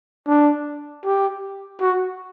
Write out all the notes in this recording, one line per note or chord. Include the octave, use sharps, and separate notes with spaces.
D4
G4
F#4